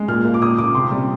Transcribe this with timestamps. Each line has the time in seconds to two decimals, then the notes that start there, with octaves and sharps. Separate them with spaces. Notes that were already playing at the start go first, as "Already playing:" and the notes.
Already playing: G#3
0.08 A#2 F6
0.25 A#3
0.34 D6
0.42 A#2 D#6
0.58 A#2 D6
0.75 C3 C6
0.91 G3